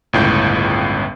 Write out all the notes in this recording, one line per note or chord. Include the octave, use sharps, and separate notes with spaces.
G1 C#2 A2 G6